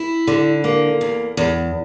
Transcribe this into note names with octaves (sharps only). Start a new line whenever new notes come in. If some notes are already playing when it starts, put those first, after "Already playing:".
Already playing: E4
D3
A#3
E2
E2